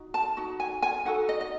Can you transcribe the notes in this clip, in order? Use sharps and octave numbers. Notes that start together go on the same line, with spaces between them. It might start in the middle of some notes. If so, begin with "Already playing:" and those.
Already playing: D#4 F#4
A5
D#4 F#4
G#5
G#5
D#4 F#4 A4 F#5
D#5
D#5